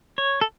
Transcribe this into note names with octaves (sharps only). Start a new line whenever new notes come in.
C#5
A4